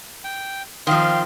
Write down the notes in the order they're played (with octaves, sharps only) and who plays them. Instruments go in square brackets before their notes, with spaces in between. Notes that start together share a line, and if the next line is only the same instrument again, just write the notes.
[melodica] G5
[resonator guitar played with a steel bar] D#3 F3 [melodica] C4 C6 [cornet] F5